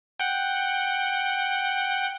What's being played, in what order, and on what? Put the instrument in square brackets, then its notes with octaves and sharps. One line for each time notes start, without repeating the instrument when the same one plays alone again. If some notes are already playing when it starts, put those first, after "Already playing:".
[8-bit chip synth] F#5 G5